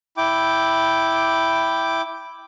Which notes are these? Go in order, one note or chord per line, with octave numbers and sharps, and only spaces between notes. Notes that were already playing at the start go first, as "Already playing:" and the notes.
E4 G5 D6